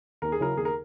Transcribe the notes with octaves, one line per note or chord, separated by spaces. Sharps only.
D#2 A#4
G#4
C#3 F#3 C#4 E4 A#4
D#2 G#4
A#4